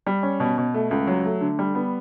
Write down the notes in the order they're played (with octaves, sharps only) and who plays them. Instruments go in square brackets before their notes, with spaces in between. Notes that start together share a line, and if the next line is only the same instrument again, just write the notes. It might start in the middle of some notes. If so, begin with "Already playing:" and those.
[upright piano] G3
C#4
B2
B2
A3
C#2
F#3
A3
D3
G3
B3